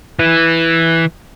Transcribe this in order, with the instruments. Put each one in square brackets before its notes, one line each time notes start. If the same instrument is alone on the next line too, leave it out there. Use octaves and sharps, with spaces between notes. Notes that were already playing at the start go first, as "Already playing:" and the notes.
[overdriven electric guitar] E3